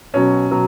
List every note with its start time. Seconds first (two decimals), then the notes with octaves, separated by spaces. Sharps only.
0.14 B2 F#3 C#4
0.51 B2 F#3